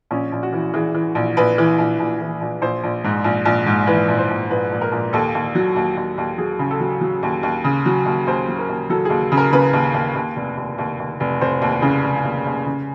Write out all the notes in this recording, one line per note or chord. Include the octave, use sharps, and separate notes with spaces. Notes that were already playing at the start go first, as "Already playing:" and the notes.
A#1 C#4
A#1
F#4
E3
E3 G#4
E3
A#1
A#1 B4
E3
A#1
A#1
E3
A#1
A#1 C5
A#1
G#2
A#1
A#1
G#2
E3 B4
A#1
C5
A#1
A#1 B4
A#1
A#4
A#1
D#2 A4
D#2
F#3
D#2
D#2
D#2
F#3 G#4
C#3
A4
F#3
F#3
D#2
D#2
C#3
F#3
D#2
D#2 C5
F#3
A#4
D#2
F#3 A4
G#4
D#2
C#3
A#4
C#3 B4
D#2
D#2
D#2
F1
D#2
D#2
D#2
F1
F1 C5
D#2
C#3
F1
D#2
D#2
C#3